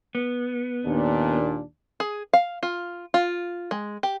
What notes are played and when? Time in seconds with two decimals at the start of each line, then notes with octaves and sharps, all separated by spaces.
0.15 B3
0.85 D#2 A#2 D4
2.00 G#4
2.33 F5
2.63 F4
3.14 F4
3.71 G#3
4.03 G4